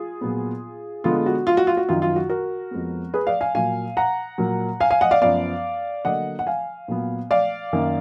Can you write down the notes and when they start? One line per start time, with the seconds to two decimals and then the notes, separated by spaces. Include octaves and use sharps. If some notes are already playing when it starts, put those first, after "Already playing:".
Already playing: F4 G#4
0.21 A#2 F#3 B3
1.04 D3 G#3 B3 F4
1.26 F#4
1.47 F4
1.57 F#4
1.67 F4
1.77 F#4
1.89 F#2 D#3 F#3 F4
2.02 F4
2.16 F#4
2.29 F#4 A#4
2.71 F2 F3 G#3 B3
3.14 G#4 B4
3.27 D5 F5
3.41 F5 G#5
3.55 A#2 F#3 A#3 F5 G#5
3.97 F#5 A#5
4.38 A#2 F#3 A#3
4.80 F5 G#5
4.90 F5 G#5
5.01 D#5 F#5
5.11 D5 F5
5.22 F#2 F3 B3 D5 F5
6.05 D3 F#3 A#3 D#5 F#5
6.39 F#5
6.47 F5 G#5
6.88 A#2 F#3 B3
7.31 D5 F5
7.73 F#2 D#3 A#3